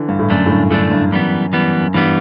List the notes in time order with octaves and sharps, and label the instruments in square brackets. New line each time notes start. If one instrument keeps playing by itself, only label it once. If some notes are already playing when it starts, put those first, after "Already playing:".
Already playing: [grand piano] D3 E3
G2
A2
[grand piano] F#2 [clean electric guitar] D3 A3 D4
[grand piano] A2
G2
[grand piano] A2 [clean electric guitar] D3 A3 D4
[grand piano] G2
[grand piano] F#2 [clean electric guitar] E3 G3 B3
[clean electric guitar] E3 G3 B3
[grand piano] F#2
[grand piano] G2 [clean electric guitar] E3 G3 B3